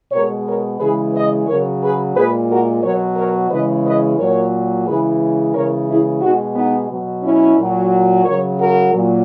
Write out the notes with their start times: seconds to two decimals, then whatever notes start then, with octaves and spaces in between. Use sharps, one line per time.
0.12 B2 G#3 A#4 C#5
0.45 A#4 C#5
0.79 C#3 E3 G#3 G#4 B4
1.13 B4 D#5
1.47 C#3 F#3 A#4 C#5
1.81 G#4 B4
2.15 A#2 G#3 G#4 B4
2.49 F#4 A#4
2.83 B2 F#3 A#4 C#5
3.17 A#4 C#5
3.50 C#3 E3 G#3 B4 D#5
3.84 B4 D#5
4.18 A#2 F#3 A#4 C#5
4.86 C#3 E3 G#3 G#4 B4
5.54 C#3 E3 G#3 A#4 C#5
5.87 E4 G#4
6.21 B2 G#3 D#4 F#4
6.55 B3 D#4
6.89 B2 F#3
7.23 C#4 E4
7.57 A#2 F#3
8.25 C#3 F#3 A#4 C#5
8.58 F#4 A#4
8.93 A#2 F#3